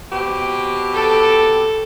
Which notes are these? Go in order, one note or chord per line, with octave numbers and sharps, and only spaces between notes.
B2 C4 G4
A4